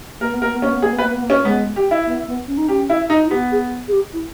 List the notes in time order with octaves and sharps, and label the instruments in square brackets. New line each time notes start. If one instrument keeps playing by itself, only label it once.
[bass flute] A#3 [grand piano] A#4
[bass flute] B3
[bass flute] A#3 [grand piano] A#4
[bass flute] B3
[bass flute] A#3 [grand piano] C#4
[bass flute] B3
[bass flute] A#3 [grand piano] G#4
[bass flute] B3
[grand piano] B4
[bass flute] A#3
B3
A#3
[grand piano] C#4
[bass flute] G#3 [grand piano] B3
[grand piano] G4
E4
[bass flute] B3
B3
C#4
D#4
[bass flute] C#4 [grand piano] G4
[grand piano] E4
D#4
[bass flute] E4
[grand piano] B3 [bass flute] G4
[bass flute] G#4
G#4
G4
E4